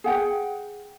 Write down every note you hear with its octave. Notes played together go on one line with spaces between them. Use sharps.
G#4 F#5 G5